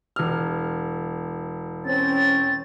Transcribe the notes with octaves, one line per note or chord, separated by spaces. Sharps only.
E1 F6
C4 C#4 A6